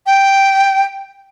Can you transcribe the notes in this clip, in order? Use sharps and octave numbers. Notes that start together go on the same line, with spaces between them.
G5